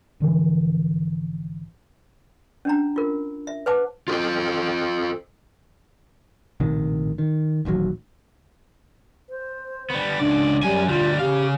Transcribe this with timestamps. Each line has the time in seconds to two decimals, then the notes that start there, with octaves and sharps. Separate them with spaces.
0.20 G#1 D3 E3 F3
2.65 C#4 D4 A#5
2.96 F4 A#4
3.47 E5
3.66 B4 C5 F#5 A5 D6
4.08 F4 A4 C5
6.60 A#1 A2 C3 D#3
7.18 D#3
7.65 D#1 A1 D#2 F#3
9.30 C5
9.90 G3 B3
10.19 C#2 D4 D5
10.63 F#2 G3 G#5
10.88 D2 G3 F4
11.19 C#3 G4 F5